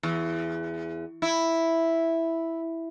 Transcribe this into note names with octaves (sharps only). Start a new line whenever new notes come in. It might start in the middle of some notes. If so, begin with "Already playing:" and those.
E2
E4